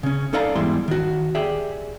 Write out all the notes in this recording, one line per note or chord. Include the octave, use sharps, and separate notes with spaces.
C#3 C#4
C#4 D#4 A4 D5 F5 A#5
E2 G#2 G3 E4 C6
D#3 F#4
G4 G#4 D5 E5